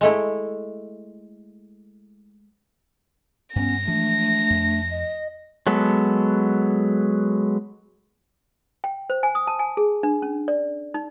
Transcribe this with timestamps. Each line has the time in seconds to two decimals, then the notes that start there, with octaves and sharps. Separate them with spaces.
0.01 G#3 A3 E4
3.56 G2 B3 C#4 A#6
3.87 E3 F3 G#3 A3 D4
4.50 F2
4.90 D#5
5.67 F#3 G#3 B3 A4
8.84 G5
9.10 C5
9.23 G#5
9.35 D#6
9.47 A5
9.59 G#5
9.77 G#4
10.03 D4
10.22 C#4
10.48 D5
10.94 D#4